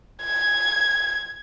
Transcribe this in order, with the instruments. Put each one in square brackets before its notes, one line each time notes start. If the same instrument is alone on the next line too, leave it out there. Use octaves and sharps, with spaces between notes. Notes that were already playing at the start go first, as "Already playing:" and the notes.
[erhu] G#6